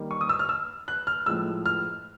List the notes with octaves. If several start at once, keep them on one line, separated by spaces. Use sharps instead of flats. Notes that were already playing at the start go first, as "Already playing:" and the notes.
Already playing: D#3 G3 A#3
C#6
D#6
E6
F6
E6
F#6
F6
A2 F3 G#3 E6
F6